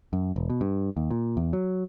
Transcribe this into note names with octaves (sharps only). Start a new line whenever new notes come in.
F#2
E1
B2
G2
D#2
A#2
E2
F#3